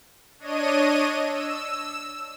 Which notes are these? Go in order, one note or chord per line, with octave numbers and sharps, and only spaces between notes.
D4 C#5 D#5 D#7
E6